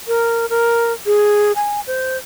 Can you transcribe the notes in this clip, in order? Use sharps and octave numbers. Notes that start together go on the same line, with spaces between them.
A#4
A#4
G#4
G#5
C5